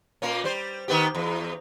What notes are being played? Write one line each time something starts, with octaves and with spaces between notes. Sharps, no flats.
A#2 A#3 C#4
G3 C5
D#3 B3 G4
E2